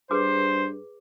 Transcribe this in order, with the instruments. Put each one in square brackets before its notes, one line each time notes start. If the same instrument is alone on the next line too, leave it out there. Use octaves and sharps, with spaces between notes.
[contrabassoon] G2 [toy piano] G#4 B4 D6 [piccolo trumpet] C5